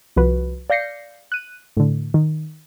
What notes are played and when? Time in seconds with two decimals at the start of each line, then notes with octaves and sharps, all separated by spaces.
0.16 C2 F3 F#4 B4
0.70 D5 F5 G6 A#6 C7 C#7
1.32 F#6 D#7
1.77 A2 D3
2.14 D#3